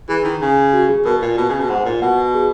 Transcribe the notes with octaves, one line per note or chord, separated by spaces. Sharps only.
E3 G#4
D#3
C#3
F#4
G#4
B2 A#4
A#2
B2
C#3
B2
G#2 F#5
A#2
B2 F#5
G#4